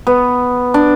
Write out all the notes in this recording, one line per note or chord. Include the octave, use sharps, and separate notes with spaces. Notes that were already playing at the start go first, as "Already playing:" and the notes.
B3
D4